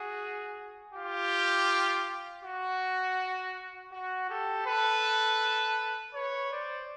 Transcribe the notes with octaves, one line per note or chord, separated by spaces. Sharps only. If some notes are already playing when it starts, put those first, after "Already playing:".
Already playing: F#4 G#4
F4 G4
F#4
F#4
G4 A4
A4 B4
B4 C#5
C5 D5